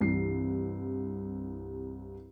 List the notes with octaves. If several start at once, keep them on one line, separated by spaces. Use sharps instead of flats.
C2 G2 E3 C7